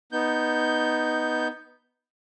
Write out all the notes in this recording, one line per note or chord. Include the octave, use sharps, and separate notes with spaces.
B3 D#4 G6